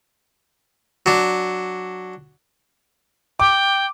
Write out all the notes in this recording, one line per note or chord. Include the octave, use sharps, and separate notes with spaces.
F#3 D4
G5 D6